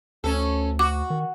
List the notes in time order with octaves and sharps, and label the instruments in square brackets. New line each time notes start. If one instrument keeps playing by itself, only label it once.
[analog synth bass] D2 [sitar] C#4 A4
[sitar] F#4 [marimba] D6
[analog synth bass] D#3